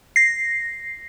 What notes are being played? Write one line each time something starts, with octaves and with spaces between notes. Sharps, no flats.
A#6 C7